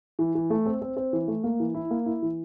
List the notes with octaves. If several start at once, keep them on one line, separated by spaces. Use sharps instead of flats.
E3
E3
A3
C4
C4
C4
E3
A3
A#3
E3
E4
A#3
E4
E3